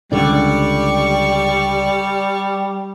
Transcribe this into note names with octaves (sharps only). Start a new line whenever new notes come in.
C#2 D3 G3 D4 D5 C#6